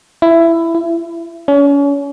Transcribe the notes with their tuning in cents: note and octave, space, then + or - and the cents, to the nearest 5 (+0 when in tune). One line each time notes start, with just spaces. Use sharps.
E4 +15
E4 +35
C#4 +35